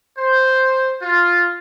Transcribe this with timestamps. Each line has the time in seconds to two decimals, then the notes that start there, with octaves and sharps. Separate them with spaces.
0.18 C5
1.02 F4